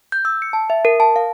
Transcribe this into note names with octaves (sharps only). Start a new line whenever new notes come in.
G6
E6
C#7
A5
E5
A#4
A5
F5